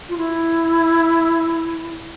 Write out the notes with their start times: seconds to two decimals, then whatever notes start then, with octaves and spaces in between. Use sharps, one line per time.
0.09 F4
0.17 E4